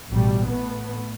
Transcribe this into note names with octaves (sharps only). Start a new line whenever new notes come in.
A1 B2 G3 A3
A2 A3 B3